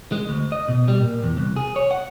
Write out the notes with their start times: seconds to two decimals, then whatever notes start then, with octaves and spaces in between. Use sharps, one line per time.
0.12 G#3
0.29 D2
0.52 D#5
0.68 B2
0.88 G3
1.00 A#2
1.24 E2
1.37 C2
1.56 G#4
1.76 C#5
1.91 F#5